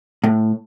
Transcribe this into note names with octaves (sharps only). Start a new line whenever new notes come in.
A2